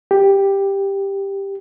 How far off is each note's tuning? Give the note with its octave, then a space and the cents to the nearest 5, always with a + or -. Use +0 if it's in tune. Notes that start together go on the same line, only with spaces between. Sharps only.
G4 +5